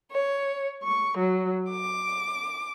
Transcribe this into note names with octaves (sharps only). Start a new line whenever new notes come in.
C#5
C#6
F#3
D6